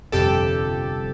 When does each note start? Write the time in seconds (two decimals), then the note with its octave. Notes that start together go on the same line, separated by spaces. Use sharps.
0.12 G1 F2 C3 G4 A4